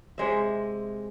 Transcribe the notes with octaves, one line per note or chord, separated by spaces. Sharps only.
C3 G#3 E5